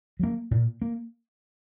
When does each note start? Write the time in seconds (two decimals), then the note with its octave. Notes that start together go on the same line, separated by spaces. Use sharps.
0.19 F#3 A#3
0.51 A#2
0.82 A#3